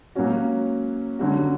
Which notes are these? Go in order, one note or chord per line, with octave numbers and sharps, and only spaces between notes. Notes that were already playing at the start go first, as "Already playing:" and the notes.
F#3 A#3 C#4 F#4
D3 F#3 C#4 F#4